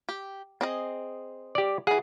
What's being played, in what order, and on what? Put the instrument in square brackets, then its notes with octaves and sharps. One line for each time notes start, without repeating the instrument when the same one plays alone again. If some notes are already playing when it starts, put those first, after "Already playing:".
[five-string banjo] G4
C4 G#4 D#5
[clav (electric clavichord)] G4 D5
[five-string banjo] E3 F#5 [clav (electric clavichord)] G#4